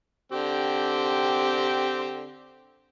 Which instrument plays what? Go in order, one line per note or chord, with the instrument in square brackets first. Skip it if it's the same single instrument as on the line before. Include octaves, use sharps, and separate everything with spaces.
[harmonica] D3 C4 G4